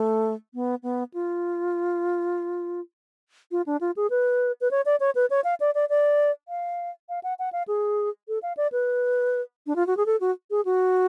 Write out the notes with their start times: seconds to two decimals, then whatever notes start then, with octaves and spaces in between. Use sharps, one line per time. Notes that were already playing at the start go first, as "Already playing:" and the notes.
Already playing: A3
0.54 B3
0.83 B3
1.14 F4
3.51 F4
3.66 D4
3.81 F4
3.96 G#4
4.10 B4
4.61 B4
4.71 C#5
4.85 D5
5.00 C#5
5.15 B4
5.30 C#5
5.44 F5
5.60 D5
5.75 D5
5.89 D5
6.48 F5
7.09 F5
7.23 F#5
7.39 F#5
7.53 F5
7.68 G#4
8.28 A4
8.43 F5
8.57 D5
8.72 B4
9.67 D4
9.76 F4
9.87 F#4
9.97 G#4
10.06 A4
10.21 F#4
10.50 G#4
10.65 F#4